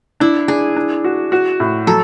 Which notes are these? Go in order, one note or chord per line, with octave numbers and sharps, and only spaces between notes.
D4 E4
D4 G#4
D4
F#4
F#4
A2
F#3 A4